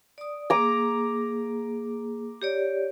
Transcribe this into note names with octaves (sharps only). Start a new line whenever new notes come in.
D5 D#6
A#3 G#4 A#5 D6
G4 C#5 D5